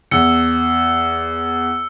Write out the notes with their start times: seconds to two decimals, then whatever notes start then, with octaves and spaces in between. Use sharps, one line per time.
0.11 E2 E6 C#7